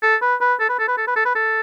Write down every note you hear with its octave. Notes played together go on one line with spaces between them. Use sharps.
A4
B4
B4
A4
B4
A4
B4
A4
B4
A4
B4
A4